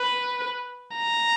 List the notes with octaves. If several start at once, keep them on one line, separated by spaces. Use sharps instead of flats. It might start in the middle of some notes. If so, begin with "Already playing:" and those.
Already playing: B4
A#5